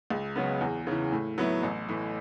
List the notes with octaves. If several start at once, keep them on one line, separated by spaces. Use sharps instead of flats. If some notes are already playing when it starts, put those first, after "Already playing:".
C#2
C#3 F#3 B3
E2
C#3 E3
A2
F#3 B3 E4
A1
A2 E3